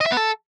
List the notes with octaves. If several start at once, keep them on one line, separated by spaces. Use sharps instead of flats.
D#5
E5
B3
A4